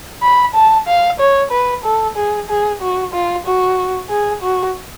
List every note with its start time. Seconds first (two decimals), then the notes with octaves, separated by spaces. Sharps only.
0.23 B5
0.55 A5
0.88 F5
1.20 C#5
1.52 B4
1.85 A4
2.16 G#4
2.49 G#4
2.81 F#4
3.14 F4
3.47 F#4
4.10 G#4
4.43 F#4